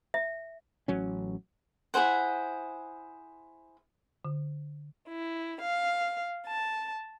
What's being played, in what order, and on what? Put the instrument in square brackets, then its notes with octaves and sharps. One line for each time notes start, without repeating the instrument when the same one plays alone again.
[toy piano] E5
[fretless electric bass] A1 F#3 C#4
[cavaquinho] E4 G#4 C5 F#5
[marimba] D3
[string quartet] E4
F5
A5